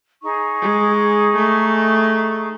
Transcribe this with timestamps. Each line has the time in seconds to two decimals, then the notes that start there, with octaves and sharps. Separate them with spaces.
0.22 D#4 G#4 C#6
0.62 G#3
1.36 A3